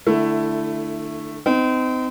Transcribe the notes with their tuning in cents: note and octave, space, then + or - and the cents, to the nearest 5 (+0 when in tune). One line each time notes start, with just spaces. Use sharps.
D3 +30 A3 +0 E4 +15
C4 -35 D#4 +0